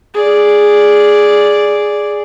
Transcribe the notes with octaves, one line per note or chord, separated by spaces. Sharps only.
G#4 D5